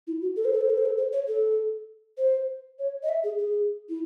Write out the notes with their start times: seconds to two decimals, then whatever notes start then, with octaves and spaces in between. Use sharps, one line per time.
0.07 E4
0.22 F#4
0.36 A4
0.45 C5
0.53 A4
0.61 C5
0.70 A4
0.78 C5
0.85 A4
0.97 C5
1.12 C#5
1.27 A4
2.18 C5
2.79 C#5
3.03 D#5
3.09 E5
3.24 G#4
3.39 G#4
3.89 E4